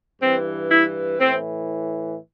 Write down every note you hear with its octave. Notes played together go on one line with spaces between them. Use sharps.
G2 E3 C4
E4
A2 E3 C4